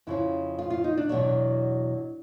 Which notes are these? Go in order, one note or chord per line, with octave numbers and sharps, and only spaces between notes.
F2 C#3 F3 E4
F4
F4
D#4
D4
E2 B2 F#3 D4